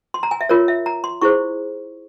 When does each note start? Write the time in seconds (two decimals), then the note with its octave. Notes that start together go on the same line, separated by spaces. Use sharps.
0.14 C6
0.23 A#5
0.31 G#5
0.41 E5
0.49 F4 A#4 C#5
0.68 E5
0.86 A#5
1.04 C6
1.21 E4 G#4 C5 C#6